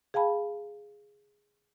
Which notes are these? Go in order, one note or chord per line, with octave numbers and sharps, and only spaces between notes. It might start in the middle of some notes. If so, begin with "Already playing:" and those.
G#4 F5 G5 A5 B5